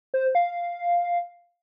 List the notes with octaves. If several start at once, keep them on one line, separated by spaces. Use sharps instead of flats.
C5
F5